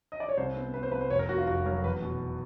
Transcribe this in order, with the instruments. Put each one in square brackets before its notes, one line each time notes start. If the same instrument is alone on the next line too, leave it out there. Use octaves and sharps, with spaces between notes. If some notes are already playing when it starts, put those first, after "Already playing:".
[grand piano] D#5
D5
C#5
C2 C5
B3
B3 B4
C5
C2 B4
C5
F1 C#5
A#4
F1 F#4
F4
F1 F#4
F#3 A#4
E2 B4
B2